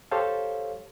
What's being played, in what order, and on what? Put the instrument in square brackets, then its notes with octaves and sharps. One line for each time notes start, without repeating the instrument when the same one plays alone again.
[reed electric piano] G4 A4 C5 C#5 F5